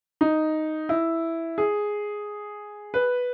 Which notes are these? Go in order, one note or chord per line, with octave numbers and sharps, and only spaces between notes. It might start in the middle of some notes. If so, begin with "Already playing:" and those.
D#4
E4
G#4
B4